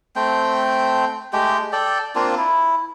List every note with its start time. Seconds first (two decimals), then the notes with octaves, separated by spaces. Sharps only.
0.16 A3 C4 G5
1.33 G#3 A3 G4 G5
1.73 A4 D5 G5
2.15 A#3 C4 D4 F4
2.37 E4